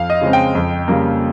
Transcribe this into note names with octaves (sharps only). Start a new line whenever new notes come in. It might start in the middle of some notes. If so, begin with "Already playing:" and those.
Already playing: F2 F5
D#5
C#3 G#3 C4
G5
F2
C#3 G3 A#3